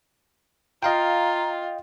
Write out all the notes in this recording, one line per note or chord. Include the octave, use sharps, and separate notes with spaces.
F4 D#5 F5 G5 A#5